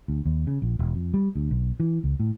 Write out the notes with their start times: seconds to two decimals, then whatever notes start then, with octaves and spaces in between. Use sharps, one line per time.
0.08 D2
0.25 D#2
0.47 C#3
0.62 A#1
0.79 E1
0.95 F2
1.14 G3
1.35 D2
1.51 B1
1.80 E3
2.04 C#2
2.20 A2